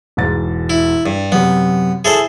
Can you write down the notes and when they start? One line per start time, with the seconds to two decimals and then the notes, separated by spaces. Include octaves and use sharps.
0.17 E1 G#2 A6
0.70 E4
1.06 G2
1.32 F#2 C3 B3
2.05 E4 G#4 A4 C5